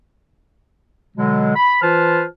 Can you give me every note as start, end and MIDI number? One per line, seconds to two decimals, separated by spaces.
1.16 1.52 47
1.16 1.52 50
1.16 1.52 54
1.16 1.52 56
1.56 1.81 83
1.82 2.24 52
1.82 2.24 65
1.82 2.24 71
1.82 2.24 72
1.82 2.24 81
1.82 2.24 89